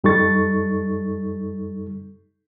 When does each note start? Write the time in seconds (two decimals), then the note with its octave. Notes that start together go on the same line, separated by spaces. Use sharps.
0.04 F#2 G3 D#4 A4 C#6 A6